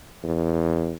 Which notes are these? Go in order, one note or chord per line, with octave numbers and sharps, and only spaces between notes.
E2